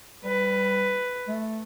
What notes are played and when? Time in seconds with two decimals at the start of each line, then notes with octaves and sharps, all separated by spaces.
0.24 G3 B4
1.28 A3